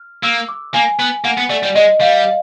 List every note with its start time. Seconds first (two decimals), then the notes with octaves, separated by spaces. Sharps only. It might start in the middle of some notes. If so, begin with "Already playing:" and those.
Already playing: F6
0.23 A#3 E6
0.49 D6
0.74 A#3 G#5
0.99 B3
1.24 A#3 F#5
1.38 B3
1.50 A3 D5
1.63 G3 D5
1.75 G#3 D#5
2.01 G3 F5